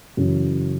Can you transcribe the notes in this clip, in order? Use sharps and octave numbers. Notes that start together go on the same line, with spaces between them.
F#2 C#3 E3